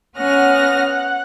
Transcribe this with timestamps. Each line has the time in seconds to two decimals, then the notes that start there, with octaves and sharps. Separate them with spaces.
0.17 B3 C#4 F#5 F6 A#6
0.86 F#5